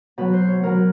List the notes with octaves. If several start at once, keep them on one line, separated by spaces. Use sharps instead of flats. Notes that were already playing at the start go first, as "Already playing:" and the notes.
B2 F#3 B4
C5
C#5
B2 F#3 A#4